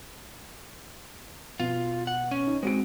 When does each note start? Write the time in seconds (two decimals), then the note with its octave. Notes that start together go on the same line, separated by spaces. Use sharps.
1.60 B2 F4
2.07 F#5
2.31 C#4
2.47 D#4
2.63 G#3 C4 F#4 D7